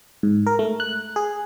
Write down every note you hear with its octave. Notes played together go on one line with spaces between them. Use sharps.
G#2
A#4
A3
F#6
G#4